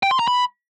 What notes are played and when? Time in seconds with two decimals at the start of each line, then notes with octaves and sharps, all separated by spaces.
0.03 G5
0.11 C6
0.19 A#5
0.28 B5